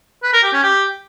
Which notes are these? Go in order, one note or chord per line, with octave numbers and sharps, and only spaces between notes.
B4
A#4
G4
C#4
G4